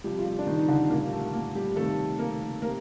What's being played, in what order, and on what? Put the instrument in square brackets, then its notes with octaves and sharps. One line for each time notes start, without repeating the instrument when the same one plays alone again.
[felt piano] C3 F3 G3 G4
F4
G3 G4
D4
D#3 D#4
D#4
D3 D4
A#2 G3 A#3
A#3
A3
A#3
G3 G4
C3 D#3 G3 A3 A4
A#3 A#4
C3 A#3 A#4